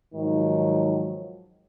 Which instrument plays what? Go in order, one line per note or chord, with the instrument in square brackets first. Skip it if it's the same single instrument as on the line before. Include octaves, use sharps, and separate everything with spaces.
[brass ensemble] G#2 D#3 F3 F#3